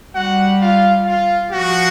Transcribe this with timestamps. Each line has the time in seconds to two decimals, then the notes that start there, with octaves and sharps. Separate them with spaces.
0.15 G3 F#4 F#5
0.61 F4 F5
1.06 F4 F5
1.52 F3 F#4 F#5